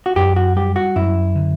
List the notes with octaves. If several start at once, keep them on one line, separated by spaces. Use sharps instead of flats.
F#4
F#2 G4
F#4
G3 G4
F#4
F#2 E4
D3